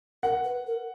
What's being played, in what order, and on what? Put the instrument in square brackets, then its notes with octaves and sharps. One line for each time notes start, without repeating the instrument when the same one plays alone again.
[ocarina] A#4 [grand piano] F#5
[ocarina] B4
A#4